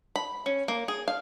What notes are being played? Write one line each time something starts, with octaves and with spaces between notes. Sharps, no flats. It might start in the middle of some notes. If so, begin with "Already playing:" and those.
B5
C#4
A#3
G#4
F5